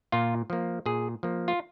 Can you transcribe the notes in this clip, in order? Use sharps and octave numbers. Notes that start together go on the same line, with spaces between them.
A#2 F4
F3 A#3
A#2 G#4
F3 A#3
F4